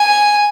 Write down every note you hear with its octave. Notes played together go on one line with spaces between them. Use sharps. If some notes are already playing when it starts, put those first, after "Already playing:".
Already playing: G#5